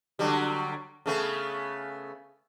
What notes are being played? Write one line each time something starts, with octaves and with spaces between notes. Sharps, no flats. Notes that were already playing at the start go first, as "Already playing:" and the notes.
D3 F#3 G3
C#3 A3 B3